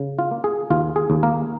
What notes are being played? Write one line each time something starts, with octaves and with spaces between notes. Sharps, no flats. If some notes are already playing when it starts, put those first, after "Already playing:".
Already playing: C#3
F4
A#3
G#4
D#2 F4
G#4
D#2
A#3 A#4